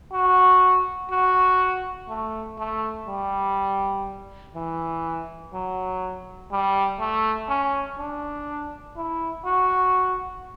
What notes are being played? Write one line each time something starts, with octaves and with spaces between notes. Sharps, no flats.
F#4
F#4
A3
A3
G3
E3
F#3
G3
A3
C#4
D4
E4
F#4